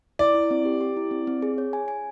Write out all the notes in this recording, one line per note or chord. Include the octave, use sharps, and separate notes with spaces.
E4 D5
E4
C4
G4
G4
E4
C4
C4
G#4
C#5
G#5
G#5